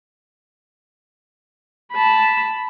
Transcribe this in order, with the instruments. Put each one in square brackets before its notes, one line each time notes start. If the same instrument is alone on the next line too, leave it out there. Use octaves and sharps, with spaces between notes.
[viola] A5 B5